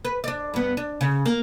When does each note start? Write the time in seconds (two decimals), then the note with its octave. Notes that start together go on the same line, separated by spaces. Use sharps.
0.05 B4
0.24 D4 D5
0.54 G2 B3
0.77 D4
1.01 C#3
1.26 A#3